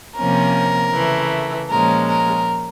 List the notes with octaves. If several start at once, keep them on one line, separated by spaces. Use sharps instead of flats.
C3 F3 A#3 C#4 A#4
C#3 E3 A3
A#2 F3 G#3 C#4 A#4
A#4